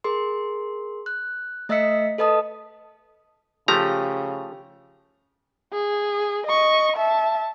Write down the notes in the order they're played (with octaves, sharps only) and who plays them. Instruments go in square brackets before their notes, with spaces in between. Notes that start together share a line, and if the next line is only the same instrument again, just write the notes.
[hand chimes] G#4 A#4 C6
F#6
A3 D#5 E5 E6 B6 C#7
A4 B4 D#5 A5 D#6
[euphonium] C#3 [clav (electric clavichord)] F3 A3 A#5 [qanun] G4
[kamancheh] G#4
D#5 C#6
E5 A5